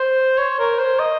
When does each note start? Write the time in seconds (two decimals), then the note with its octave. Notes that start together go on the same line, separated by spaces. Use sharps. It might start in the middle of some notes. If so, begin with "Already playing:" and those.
Already playing: C5
0.38 C#5
0.59 A#4
0.79 C5
0.99 D#5